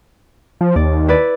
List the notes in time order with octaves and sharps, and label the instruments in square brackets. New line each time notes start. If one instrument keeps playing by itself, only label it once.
[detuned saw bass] F3
[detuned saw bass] D#2 [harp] D5
[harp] E4 B4 D5